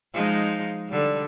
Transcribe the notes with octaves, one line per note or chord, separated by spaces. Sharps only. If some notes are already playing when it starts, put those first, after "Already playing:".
F3 G#3 D#4
D3 G3